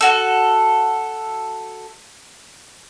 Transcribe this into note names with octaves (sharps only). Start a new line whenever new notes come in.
F#4 A4